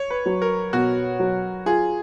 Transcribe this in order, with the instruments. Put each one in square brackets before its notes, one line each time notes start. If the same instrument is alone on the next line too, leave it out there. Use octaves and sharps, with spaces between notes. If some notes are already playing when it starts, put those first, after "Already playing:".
Already playing: [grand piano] C#5
B4
[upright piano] F#3
[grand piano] A#4
[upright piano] B2 [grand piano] F#4
[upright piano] F#3
[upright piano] F4 [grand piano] G#4